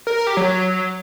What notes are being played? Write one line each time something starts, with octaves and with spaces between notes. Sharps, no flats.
A#4
A#4
G4
F#3